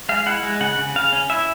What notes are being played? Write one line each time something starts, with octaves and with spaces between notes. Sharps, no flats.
G#3 F5
E4 F#5
G#3
C#3 F#5
C#3
C#3 F5
C#4
E4 E5